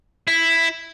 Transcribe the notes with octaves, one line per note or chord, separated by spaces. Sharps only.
E4